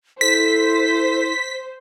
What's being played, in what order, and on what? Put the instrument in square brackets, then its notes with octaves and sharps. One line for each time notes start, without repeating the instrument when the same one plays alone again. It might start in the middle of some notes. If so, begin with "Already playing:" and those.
[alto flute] E4 [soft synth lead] A4 [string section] C5 [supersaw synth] B6